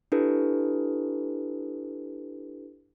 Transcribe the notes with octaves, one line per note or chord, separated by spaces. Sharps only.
D4 E4 G4 A4 B4